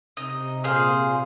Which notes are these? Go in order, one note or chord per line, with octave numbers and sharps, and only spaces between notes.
C3 D#4
A#2 G#4 C5 F5